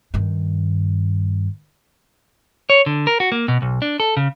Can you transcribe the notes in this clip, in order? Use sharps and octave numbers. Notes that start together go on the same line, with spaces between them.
G2 D#3
C#5
D3
A#4
F#4
A#3
B2
B1
D4
A4
C#3